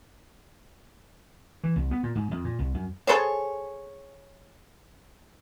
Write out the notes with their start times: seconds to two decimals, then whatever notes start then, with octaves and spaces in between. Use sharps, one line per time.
1.64 E3
1.76 C2
1.91 B3
2.03 A#2
2.15 G#2
2.31 F2
2.44 A#2
2.59 C2
2.74 F#2
3.07 G#4 A4 C5 C#5